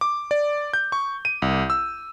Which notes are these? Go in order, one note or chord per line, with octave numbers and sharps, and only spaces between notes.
D6
D5
G6
C#6
D#7
C2
E6